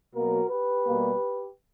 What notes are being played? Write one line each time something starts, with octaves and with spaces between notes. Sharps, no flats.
B2 F#3 A#3 F#4 A#4
G4 B4
B2 G3 A#3